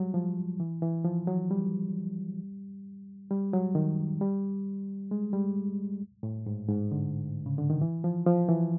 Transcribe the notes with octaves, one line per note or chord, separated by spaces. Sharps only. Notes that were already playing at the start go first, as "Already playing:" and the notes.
Already playing: F#3 G3
F3
E3
E3
F3
F#3
G3
G3
F#3
D#3
G3
G#3
G3
A2
G#2
G#2
D3
C#3
D3
D#3
E3
F3
F3
E3